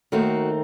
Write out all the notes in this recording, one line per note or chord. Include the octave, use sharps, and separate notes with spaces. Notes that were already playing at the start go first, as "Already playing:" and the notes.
D#2 D#3 A3 C4 D#4 F#4